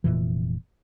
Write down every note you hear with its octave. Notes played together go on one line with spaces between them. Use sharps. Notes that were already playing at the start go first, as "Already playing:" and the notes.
F1 A#1 A#2 E3